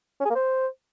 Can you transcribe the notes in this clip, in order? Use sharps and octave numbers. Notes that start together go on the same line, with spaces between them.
C#4
G#4
A#3
C5